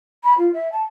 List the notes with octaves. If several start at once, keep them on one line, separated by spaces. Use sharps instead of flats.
B5
F4
E5
A5